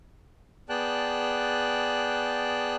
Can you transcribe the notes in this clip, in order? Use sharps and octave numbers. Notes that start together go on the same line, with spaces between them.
B3 G#4 D5 G5 A5 F#6